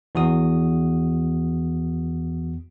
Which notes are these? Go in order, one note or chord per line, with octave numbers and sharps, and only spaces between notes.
E2 F#4 D#6